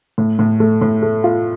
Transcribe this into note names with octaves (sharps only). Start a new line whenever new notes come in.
A2
A2
A3
A2
A3
F4